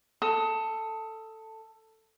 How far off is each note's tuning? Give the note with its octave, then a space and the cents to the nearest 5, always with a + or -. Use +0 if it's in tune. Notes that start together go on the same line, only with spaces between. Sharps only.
A4 +10 D#6 +30